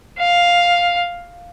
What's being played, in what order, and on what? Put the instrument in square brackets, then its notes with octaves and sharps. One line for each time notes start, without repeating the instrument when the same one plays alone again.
[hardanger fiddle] F5